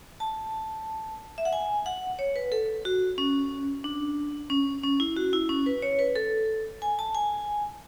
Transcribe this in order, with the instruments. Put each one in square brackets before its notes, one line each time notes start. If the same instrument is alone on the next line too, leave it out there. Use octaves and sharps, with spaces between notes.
[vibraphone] A5
E5
F#5
G#5
F#5
C#5
B4
A4
F#4
C#4
D4
C#4
C#4
E4
F#4
E4
C#4
B4
C#5
B4
A4
G#5
A5
G#5